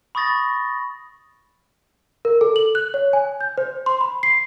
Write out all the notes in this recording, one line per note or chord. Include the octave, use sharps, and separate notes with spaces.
B5 C#6 D#6 A6 A#6
A#4
A4
F#7
F#6
C#5
G#5
G6
C5
C6
B5
C7